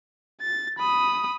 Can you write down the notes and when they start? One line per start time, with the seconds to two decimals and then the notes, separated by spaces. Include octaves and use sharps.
0.42 A6
0.78 B5 D#6